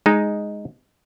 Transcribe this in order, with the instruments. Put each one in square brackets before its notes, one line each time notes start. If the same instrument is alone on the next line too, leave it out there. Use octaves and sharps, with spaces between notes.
[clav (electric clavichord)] G#3 D#4